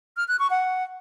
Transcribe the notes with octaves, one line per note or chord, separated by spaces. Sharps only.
F6
F#6
C#6
F#5